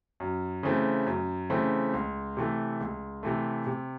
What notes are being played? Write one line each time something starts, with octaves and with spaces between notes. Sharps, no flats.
F#2
C#3 E3 A3 C4
F#2
C#3 E3 A3 C4
C#2
C3 E3 A3
C#2
C3 E3 A3
C3